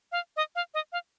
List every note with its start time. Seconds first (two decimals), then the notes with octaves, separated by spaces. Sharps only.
0.12 F5
0.36 D#5
0.55 F5
0.74 D#5
0.92 F5